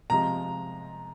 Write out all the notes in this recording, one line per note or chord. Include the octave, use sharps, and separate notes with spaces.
C3 F3 G#3 A#5